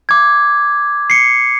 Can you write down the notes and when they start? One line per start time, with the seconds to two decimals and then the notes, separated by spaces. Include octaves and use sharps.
0.09 D6 G#6
1.10 C7 C#7